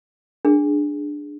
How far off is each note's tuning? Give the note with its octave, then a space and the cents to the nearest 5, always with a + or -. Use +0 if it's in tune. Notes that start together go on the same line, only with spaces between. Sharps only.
D4 +5 G#4 +0